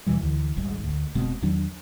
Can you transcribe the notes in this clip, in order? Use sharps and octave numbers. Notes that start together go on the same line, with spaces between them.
D#2 B2 E3 G3
D2 D3 E3
D#1 G#1 G#2 G3
D2
F1 B2 G#3 C4
E2 D#3 F#3 D4